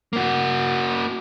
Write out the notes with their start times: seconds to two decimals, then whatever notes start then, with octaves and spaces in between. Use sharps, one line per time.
0.13 A#3 F#4